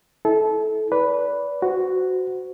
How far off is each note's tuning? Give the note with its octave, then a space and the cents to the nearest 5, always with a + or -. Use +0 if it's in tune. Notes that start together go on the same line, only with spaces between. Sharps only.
E4 -25 A4 -25
B4 +0 D5 -30
F#4 +0 C5 -30